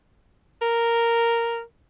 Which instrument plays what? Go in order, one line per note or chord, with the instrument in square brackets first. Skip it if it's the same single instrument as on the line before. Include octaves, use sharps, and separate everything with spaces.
[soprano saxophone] A#4